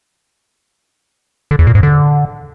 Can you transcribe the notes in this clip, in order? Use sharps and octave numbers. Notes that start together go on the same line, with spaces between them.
D3
E2
A#2
G#2
D3